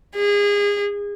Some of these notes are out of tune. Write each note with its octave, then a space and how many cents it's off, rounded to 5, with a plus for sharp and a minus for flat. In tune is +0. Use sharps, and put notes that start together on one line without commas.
G#4 -30